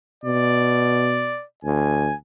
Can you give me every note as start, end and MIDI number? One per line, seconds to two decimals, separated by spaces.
0.24 1.37 47
0.24 1.45 74
1.64 2.11 38
1.64 2.16 80